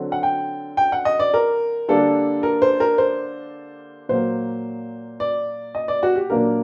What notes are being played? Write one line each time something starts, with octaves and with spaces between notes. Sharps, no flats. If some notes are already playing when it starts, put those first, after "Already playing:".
Already playing: D3 F#3 C4
F#5
G5
G5
F#5
D#5
D5
A#4
D3 G3 A#3 D4 A4
A#4
C5
A#4
C5
A#2 F#3 A#3 C5
D5
D#5
D5
F#4
G4
A#2 F#3 A#3 D4 A#4